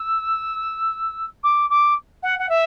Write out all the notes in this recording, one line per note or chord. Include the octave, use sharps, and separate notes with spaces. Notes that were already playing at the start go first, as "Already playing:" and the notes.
Already playing: E6
D6
D6
F#5
F#5
E5